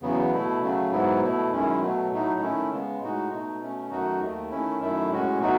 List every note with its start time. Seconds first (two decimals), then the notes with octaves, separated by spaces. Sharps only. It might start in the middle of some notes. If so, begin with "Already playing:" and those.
0.02 E2 C#3 F#3 B3
0.32 B2 A3 E4
0.62 C#3 F#3 A3
0.91 G#2 F#3 B3 E4
1.21 B2 A3 E4
1.51 F#2 D#3 G#3 C#4 E4
1.81 B2 F#3 A3
2.11 A2 F#3 A3 D#4
2.40 D#3 A3 C#4 E4
2.71 C#3 G#3 B3
3.01 A2 G#3 D#4 F#4
3.31 B2 A3 D#4
3.60 B2 A3 C#4
3.90 F#2 D#3 A3 D#4 F#4
4.20 D#2 D#3 A3
4.50 D#3 A3 C#4 E4
4.81 F#2 D#3 A3 E4
5.10 A2 G#3 C#4 F#4
5.40 B2 F#3 A3 D#4 F#4